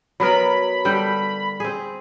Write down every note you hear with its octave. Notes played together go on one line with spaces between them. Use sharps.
F#3 B3 A#4 B5
D3 G3 G5
C4 G#4